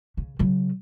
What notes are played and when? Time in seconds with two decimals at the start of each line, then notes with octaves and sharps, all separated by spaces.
0.17 C#3
0.39 C#3 F#3